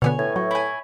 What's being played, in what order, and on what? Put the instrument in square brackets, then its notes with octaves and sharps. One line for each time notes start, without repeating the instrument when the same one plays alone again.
[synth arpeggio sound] B2 D3 B3 [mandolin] C#5 G#5
[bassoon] A2 [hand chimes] B4 G#6
[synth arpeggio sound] F#3 [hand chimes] C#5 E5 C#6
[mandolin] E4 G#5 [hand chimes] B5